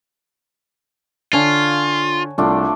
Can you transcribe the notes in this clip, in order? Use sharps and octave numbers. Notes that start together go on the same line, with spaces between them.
D3 F4 C#5 G#5 A5
C2 A3 D4 F4